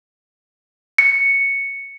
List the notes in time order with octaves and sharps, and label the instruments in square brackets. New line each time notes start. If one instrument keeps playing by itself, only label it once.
[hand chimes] C#7